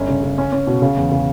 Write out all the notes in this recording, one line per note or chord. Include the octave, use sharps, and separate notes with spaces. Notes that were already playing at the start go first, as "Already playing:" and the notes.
Already playing: G1 C#4
C#3
C#3
C#4
C#4
B2
C#3
E2
C#3